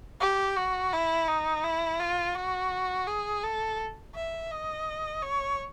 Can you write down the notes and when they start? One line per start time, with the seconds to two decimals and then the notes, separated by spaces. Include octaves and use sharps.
0.21 G4
0.57 F#4
0.93 E4
1.28 D#4
1.64 E4
2.00 F4
2.36 F#4
3.07 G#4
3.43 A4
4.15 E5
4.51 D#5
5.22 C#5